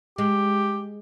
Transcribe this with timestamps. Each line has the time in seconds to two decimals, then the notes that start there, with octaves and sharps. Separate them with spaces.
0.18 G#3 G4